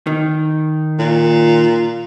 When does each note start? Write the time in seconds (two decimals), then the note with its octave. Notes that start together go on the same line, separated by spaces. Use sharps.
0.07 D#3
0.99 A#2